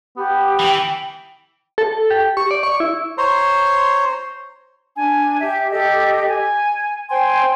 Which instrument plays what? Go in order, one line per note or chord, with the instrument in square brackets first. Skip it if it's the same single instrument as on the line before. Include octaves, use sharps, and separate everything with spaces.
[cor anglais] B3 [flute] G4
[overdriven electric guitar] E3 [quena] G5
[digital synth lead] A4
A4
G4
C#6
D5
C#6
E4
[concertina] C5 C#5 A#5 C6
[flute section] D4 G#5
G4 E5
G4 A4 D#5
G#5
C5 G5 G#5 C6